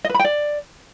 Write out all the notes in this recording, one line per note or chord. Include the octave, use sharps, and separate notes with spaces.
D#5
B4
B5
G5
D5